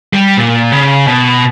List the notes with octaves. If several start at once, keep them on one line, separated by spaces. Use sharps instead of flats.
G3
A#2
C#3
B2